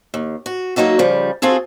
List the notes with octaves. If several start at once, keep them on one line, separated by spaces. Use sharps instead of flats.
D#2
F#4
F#3 A#3 D#4 F#4 A4
C#3 F3 G3
C4 F4 F#4 G#4 A4